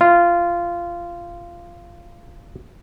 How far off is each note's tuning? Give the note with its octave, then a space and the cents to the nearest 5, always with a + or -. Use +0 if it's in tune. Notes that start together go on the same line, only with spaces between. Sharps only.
F4 -15